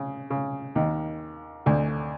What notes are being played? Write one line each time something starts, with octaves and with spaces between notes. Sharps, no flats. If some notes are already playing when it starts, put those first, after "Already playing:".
Already playing: C#3
C#3
D#2 D#3
D2 D3